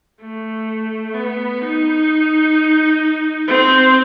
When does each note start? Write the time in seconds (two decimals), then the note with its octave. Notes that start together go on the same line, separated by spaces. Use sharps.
0.20 A3
1.14 B3
1.62 D#4
3.48 C4